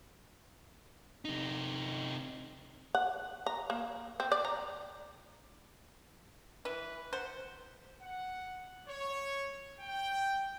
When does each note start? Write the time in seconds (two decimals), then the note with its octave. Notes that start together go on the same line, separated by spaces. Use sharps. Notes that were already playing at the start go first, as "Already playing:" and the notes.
1.25 C3 D#4
2.95 F#5
3.46 A#5
3.70 A#3
4.20 C4
4.32 D5
4.45 A#5
6.65 E3 B4
7.13 C5 F#5
8.02 F#5
8.88 C#5
9.81 G5